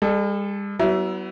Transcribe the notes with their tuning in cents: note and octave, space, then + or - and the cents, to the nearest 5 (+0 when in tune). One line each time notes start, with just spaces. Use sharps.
G3 +45 A4 -15
F#3 +40 B3 +0 E4 +0